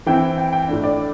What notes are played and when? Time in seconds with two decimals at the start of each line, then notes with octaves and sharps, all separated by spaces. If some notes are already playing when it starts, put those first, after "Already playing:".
0.06 E3 C4 E4 G5
0.38 G5
0.53 G5
0.68 A2 A3 D4
0.84 D5